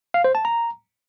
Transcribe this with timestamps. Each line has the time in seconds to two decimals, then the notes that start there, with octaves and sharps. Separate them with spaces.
0.14 F5
0.24 C5
0.35 A5
0.45 A#5